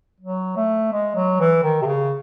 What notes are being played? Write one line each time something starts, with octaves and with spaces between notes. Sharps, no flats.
F#3
A3
G#3
F#3
E3
D#3
C3
C#3